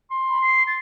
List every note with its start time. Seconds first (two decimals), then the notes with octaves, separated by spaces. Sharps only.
0.11 C6
0.30 B5
0.42 C7
0.67 A6